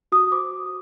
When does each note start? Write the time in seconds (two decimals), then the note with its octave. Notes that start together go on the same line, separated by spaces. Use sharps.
0.12 F#4 D#6
0.32 C5 D6